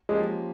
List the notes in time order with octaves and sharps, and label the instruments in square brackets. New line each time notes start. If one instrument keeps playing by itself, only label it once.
[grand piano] F3 A#3 C#4 G4 [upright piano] G#3